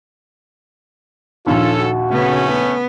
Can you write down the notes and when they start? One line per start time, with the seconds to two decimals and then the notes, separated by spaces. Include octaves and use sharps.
1.47 A#1 D#2 C#4 F4 A4
1.79 F#4
2.11 C#3 A3 B3 C#4
2.46 B3